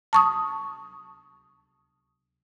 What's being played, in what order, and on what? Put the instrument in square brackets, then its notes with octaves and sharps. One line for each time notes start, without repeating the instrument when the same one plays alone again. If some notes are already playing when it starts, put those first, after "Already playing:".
[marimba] A5 C#6 D#6